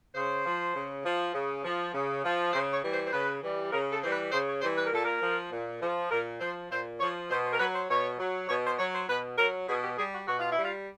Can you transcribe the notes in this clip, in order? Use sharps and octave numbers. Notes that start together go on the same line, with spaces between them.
C#3 C5
F3
C#3
F3
C#3
F3
C#3
F3
C#3 C5
C#5
E3 G3
C5
C5
C#3 B4
E3 G3
C#3 A#4
A4
E3 G3 C5
B4
C#3 C5
C#5
E3 G3 C5
B4
A#4
A#2 A4
A#4
F3
A#2
F3
A#2 A#4
F3 C5
A#2 C5
F3 C#5
B2 C5
C5
A#4
F#3 B4
C5
B2 C#5
F#3
B2 C#5
C5
F#3 C#5
C5
B2 B4
F#3 A#4
B2 G#4
G4
G3 G#4
F#4
B2 F#4
F4
E4
G3 F4